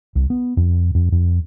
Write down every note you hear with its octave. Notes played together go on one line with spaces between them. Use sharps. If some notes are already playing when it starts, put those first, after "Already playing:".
C2
B3
F2
F2
F2